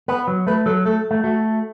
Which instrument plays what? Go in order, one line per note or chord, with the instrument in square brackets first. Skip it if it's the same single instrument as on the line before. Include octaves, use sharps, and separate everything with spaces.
[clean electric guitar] B3 [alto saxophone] B4
[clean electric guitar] F#3
[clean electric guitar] A3 [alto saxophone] B4
[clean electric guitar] F#3 [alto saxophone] A4
[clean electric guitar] A3 [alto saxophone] A4
[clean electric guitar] A3
[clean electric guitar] A3 [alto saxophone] F#4